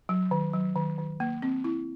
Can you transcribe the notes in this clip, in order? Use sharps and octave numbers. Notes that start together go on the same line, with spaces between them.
F#3
D#3
F#3
D#3
D#3
A#3
C4
E4